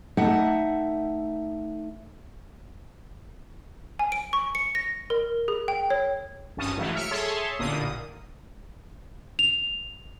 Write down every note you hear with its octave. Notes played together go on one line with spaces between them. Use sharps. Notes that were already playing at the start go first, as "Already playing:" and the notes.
A3 D#4 E5 F#5
G#5
D7
C#6
C#7
A#6
A#4
G#4
G5
C#5
G#1 G2 C#4 A5 D#6
G#2 C#3 E3 F#3 A3
E5 F6 C#7 D7
G#4 A4 C#5 E5 A5 C6
A1 A#2 D3 A#3 D#6
F7